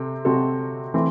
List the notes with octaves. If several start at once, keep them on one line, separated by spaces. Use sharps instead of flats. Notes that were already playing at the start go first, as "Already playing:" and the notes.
Already playing: C3 C4 A4
C3 F#3 C4 F#4 A4
E3 A3 C4